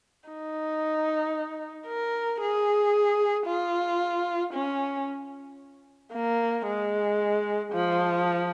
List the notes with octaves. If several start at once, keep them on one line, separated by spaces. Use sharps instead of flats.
D#4
A#4
G#4
F4
C#4
A#3
G#3
F3